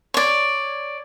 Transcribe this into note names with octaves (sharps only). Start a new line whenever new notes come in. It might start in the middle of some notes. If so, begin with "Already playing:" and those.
C#5 D5